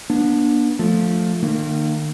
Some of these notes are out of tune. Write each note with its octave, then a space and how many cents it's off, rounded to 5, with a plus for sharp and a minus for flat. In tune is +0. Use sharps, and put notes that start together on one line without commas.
B3 -40 D4 +5
F3 +15 A3 +0
D#3 -40 A#3 -25